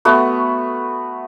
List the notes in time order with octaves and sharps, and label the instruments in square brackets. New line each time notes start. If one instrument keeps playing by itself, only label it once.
[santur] A3 B3 F#4